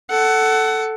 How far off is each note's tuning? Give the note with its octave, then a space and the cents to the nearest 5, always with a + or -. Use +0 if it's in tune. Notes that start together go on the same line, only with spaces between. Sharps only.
A4 +0 F#5 +20